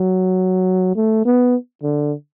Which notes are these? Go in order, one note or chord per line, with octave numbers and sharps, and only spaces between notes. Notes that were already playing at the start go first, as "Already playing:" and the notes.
Already playing: F#3
A3
B3
D3